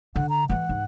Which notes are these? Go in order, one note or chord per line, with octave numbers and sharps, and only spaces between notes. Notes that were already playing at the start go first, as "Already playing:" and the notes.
D3 F#5
A#5
E3 A3 F#5
G#2